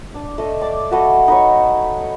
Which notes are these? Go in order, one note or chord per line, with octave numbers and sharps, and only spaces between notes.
D4
A3 D#5
D5 D6
A3 B3 F#4 D#5
D#4 B4 C#5